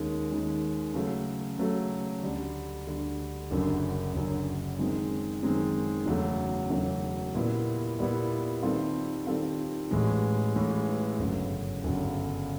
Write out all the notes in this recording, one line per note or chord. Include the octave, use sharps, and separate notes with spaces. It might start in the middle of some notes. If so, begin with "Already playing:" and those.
Already playing: D#2 D#3 G#3 C#4
D#2 D#3 G#3 C#4
C#3 F#3 A3
C#3 F#3 A3
D2 D3 G3
D2 D3 G3
F#1 F#2 D3
F#1 F#2 D3
F#2 D#3 G#3 C4
F#2 D#3 G#3 C4
E1 E2 C#3 F#3 A3
E1 E2 C#3 F#3 A3
A#2 G3 B3 E4
A#2 G3 B3 E4
D#3 G3 C4 F4 A4
D#3 G3 C4 F4 A4
A1 A2 E3 G#3
A1 A2 E3 G#3
G1 F#2 C#3 F#3
G1 F#2 C#3 F#3